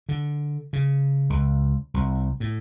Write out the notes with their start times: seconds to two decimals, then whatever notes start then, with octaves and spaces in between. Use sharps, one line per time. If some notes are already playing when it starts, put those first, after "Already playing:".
0.09 D3
0.73 C#3
1.30 C#2
1.94 C2
2.40 A2